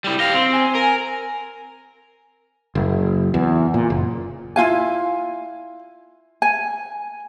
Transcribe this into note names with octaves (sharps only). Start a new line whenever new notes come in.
G3 E4
G4 F5 A#6
C4
G#5
A#4
F#1
E2
A#2
F#1
E4 F4 F5 G#5
G#5